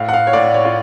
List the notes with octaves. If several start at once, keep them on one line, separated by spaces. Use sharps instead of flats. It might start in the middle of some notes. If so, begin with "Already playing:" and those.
Already playing: A2 F5
F#5
F5
C#5
A2 D5
C#5
F4